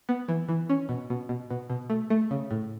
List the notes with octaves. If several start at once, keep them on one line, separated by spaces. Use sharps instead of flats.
B3
E3
E3
C#4
B2
B2
B2
B2
B2
A3
A3
C#3
A2